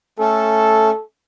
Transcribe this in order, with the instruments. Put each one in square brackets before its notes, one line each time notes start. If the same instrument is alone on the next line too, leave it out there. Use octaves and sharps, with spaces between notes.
[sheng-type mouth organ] A3 C#4 [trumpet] A4